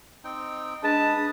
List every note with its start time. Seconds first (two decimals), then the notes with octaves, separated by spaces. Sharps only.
0.24 C4 D#4 G5
0.83 G#3 D4 B4 A5 D#6